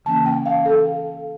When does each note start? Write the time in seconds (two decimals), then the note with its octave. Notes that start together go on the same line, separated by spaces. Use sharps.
0.05 C#3 E3 A#3 C#4 A5
0.26 G5
0.46 F5
0.66 A4